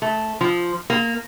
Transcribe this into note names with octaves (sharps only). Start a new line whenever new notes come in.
A3
F3
A#3